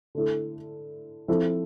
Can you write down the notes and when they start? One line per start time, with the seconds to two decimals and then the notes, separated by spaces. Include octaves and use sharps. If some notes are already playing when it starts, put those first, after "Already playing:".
0.15 D3 A3 E4 A4
1.28 F3 C4 E4 A4